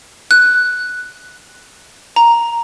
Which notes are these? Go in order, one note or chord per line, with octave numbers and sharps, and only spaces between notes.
F#6
A#5